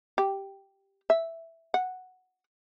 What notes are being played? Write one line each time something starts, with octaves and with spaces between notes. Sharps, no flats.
G4
E5
F#5